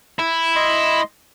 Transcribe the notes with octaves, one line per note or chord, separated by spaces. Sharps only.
E4
D#5 C6